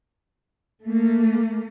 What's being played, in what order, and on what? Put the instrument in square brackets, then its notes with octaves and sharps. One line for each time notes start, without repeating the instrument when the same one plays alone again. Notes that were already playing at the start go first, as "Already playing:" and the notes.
[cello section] A3 A#3